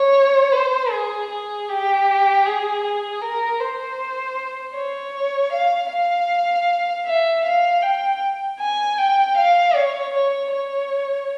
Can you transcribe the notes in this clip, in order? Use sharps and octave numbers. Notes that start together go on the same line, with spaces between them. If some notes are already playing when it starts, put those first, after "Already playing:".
Already playing: C#5
C5
G#4
G#4
G4
G#4
G#4
A#4
C5
C#5
F5
F5
E5
F5
G5
G#5
G5
F5
C#5
C#5
C#5